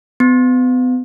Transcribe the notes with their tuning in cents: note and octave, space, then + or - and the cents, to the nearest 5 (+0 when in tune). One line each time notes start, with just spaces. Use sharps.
B3 +35